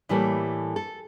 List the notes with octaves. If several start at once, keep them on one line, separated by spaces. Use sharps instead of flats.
A2 E3 G3 A3 A#3
A4